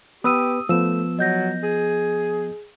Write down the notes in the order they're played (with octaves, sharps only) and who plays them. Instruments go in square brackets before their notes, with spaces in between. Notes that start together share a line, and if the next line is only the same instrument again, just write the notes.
[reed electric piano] B3 B4 [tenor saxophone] G4 [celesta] D#6 E6 D#7
[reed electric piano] F3 B3 [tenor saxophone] A3 [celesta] E6 E7
[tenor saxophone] F#3 [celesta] D#5 G6 A#6
[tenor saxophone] G#4